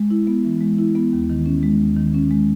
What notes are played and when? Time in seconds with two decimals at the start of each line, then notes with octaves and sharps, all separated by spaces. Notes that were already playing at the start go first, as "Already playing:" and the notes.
Already playing: G#3
0.10 E4
0.27 B3
0.45 E3
0.61 G#3
0.79 E4
0.95 B3
1.13 D#2
1.30 D#3
1.46 C#4
1.63 G#3
1.80 D#2
1.97 D#3
2.14 C#4
2.31 G#3